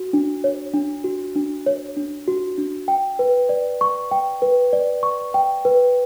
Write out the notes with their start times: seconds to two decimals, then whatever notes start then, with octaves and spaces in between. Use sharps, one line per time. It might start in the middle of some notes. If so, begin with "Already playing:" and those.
Already playing: F#4
0.13 D4
0.44 C#5
0.74 D4
1.04 F#4
1.35 D4
1.66 C#5
1.97 D4
2.28 F#4
2.58 D4
2.88 G5
3.19 B4
3.49 D5
3.81 C#6
4.11 G5
4.42 B4
4.73 D5
5.03 C#6
5.34 G5
5.65 B4